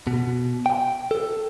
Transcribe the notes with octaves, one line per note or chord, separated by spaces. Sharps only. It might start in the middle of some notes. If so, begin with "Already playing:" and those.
B2
G5
A4